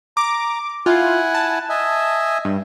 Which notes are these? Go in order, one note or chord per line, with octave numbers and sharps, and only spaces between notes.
A#5 D6
E4 F4 F#5 G#5
A5
D#5 E5 G#5
G2